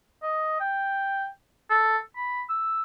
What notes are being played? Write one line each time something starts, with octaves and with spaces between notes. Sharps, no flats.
D#5
G5
A4
B5
E6